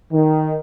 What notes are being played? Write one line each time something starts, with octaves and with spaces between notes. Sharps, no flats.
D#3